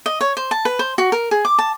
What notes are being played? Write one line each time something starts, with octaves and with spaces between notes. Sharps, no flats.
D#5
C#5
C5
A5
B4
C5
F#4
A#4
G#4
D6
A5